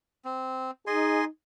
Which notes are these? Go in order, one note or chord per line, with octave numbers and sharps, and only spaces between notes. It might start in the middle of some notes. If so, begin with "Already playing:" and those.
C4
D#4 G#4 D#5 G#5 C6